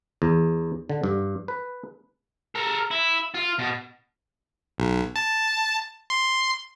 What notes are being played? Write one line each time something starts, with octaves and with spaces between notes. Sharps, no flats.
E2
D3
G2
B4
A4 A#4
E4
F4
B2
B1
A5
C6